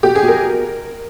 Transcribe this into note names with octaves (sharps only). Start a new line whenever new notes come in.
B2 G4
G#4
B2
A#4